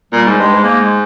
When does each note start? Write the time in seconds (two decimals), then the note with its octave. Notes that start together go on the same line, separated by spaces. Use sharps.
0.12 A#2 G3
0.26 G#2
0.38 G2 G#3
0.54 G#2
0.64 A#3
0.81 G#3